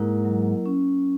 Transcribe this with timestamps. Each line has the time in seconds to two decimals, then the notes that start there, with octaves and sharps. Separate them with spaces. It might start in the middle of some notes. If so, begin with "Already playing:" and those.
Already playing: G#2 A#3 E4 A#4
0.25 F#3
0.66 C#4